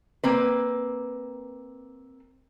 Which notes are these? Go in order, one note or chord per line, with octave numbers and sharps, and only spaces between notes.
A#3 C4 B4